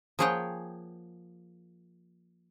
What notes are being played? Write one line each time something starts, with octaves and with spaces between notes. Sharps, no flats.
F3 A#3 G#4 C#5 F#5 G5